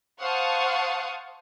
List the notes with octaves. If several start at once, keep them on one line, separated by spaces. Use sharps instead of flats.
C5 F5 F#5 A5 C#6 D#6